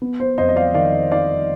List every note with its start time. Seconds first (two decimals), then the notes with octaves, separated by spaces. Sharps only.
0.02 B3
0.20 C5
0.38 F2 C5 D#5
0.49 D#5
0.56 D5 F5
0.74 D#3 D5 F5
1.11 D#4 D5 F5